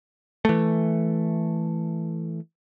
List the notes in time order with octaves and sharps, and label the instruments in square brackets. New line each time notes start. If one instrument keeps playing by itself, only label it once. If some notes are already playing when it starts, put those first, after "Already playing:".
[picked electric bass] E3 A3